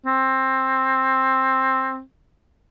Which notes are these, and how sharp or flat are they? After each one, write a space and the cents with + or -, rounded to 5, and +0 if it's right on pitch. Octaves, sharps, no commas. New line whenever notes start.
C4 +15